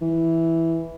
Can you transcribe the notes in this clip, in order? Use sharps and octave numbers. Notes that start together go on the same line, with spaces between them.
E3